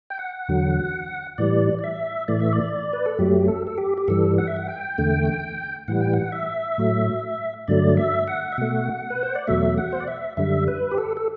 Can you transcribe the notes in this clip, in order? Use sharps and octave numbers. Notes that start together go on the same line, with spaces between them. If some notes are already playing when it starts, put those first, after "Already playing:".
G5
F#5
E2 D3 F#3
A2 E3 G3 D5
D5
E5
A2 E3 A3 D5
E5
D5
B4
A4
F#2 F#3 A3 G4
A4
A4
G4
G4
G2 E3 G3 A4
F#5
E5
F#5
G5
E2 D3 A3
A2 E3 G3 F#5
G5
F#5
E5
A2 F#3 A3
G2 D3 F#3 A3 D5
E5
F#5
E5
B2 A3 F#5
B4
C5
D5
E2 B2 F#3 A3 E5
F#5
C5
D5
E5
F#2 D3 G3 E5
B4
G4
A4
A4